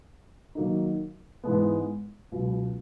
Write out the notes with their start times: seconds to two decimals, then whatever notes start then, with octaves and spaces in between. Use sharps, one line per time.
0.55 D#3 F#3 A#3 D#4
1.44 G#2 E3 G#3 B3
2.32 C#2 B2 F#3